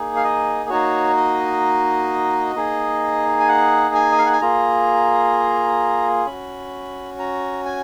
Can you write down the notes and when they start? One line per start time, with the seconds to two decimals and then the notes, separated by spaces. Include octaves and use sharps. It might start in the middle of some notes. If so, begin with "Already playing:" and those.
Already playing: A#3 D#4 G#4
0.16 F5
0.24 D#5
0.70 A#3 D#4 F#4 C#5
1.17 D#5
2.56 A#3 D#4 G#4
3.40 G#5
3.49 F#5
3.95 G#5
4.12 D#5
4.19 F5
4.26 F#5
4.33 G#5
4.41 A#3 F4 G#4 A#5
6.26 C#4 F#4 B5
7.19 A#5
7.66 G#5